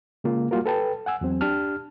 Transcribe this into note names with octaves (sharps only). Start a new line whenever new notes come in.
C#3 G#3 A#3 F4
G3 A#3 F4 F#4 A#4
A4 B4 G5 A5
F#5 G#5 E6
E2 F#3 C4
D4 G4 A5 F6